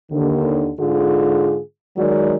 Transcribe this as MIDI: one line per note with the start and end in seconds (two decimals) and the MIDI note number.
0.12 0.72 39
0.12 0.72 50
0.80 1.60 44
0.80 1.60 50
0.80 1.60 65
0.80 1.60 68
1.97 2.36 51
1.97 2.36 54
1.97 2.36 56
1.97 2.36 66
1.97 2.36 74